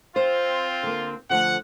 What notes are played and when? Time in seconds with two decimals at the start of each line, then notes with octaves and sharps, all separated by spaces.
0.16 C4 F4 C5
0.83 D3 A#3
1.30 D3 F3 A3 F#5